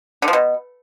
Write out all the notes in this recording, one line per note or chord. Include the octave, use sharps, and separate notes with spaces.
D3
F3
B2